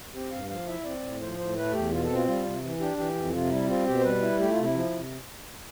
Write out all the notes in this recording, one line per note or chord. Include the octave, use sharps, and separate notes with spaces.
C4 G4
G2 F5
F3 F5
E4 E5
C4 D5
A2
F3 C5
A2 C5
A3 B4
E2 G4
B2 F4
A4
C4
F4
G3 F4
C3
E3
D4 G4
E3 G4
F2
C3 F4
G3 E4
C4 F4
B2 G4
C5
G3 B4
E4
A3 G4
F4
C3
E4
F3
C3